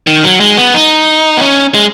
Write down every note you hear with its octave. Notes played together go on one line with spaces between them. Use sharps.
D#3
F#3
G#3
B3
D#4
B3
C#4
G#3